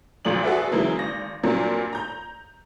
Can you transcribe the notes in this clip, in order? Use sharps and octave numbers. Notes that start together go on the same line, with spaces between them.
G#1 F2 A#2 F#3 D5 F#7
F#4 G#4 A4 B4 D5 E5
C#3 E3 F#3 G#3 A#3 E4
G#1 A#6
G2 A#2 F#3 A#3 C4 F4
A#5 G6